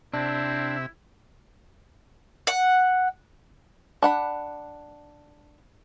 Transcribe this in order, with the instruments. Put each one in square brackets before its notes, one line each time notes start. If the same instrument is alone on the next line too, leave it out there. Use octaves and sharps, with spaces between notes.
[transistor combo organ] C3 E5 [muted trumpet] C4 [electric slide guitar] D4 [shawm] E4
[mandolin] F#5
[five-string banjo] D4 F#5 B5